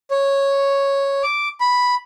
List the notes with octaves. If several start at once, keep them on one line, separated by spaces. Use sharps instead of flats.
C#5
D6
B5